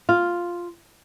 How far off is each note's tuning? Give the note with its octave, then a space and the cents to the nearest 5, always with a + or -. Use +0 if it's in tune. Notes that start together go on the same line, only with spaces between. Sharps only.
F4 +0 F5 +0